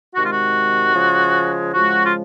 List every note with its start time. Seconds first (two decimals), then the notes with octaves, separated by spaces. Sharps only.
0.14 C3 D#3 G#3 F#4
0.24 F4
0.32 F#4
0.94 C#3 F3 G#3
1.73 C#3 F3 G#3 F#4
2.06 F4